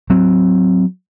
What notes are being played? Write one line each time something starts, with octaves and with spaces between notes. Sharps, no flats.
F#3 C4